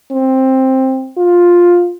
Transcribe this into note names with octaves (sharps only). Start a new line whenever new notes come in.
C4
F4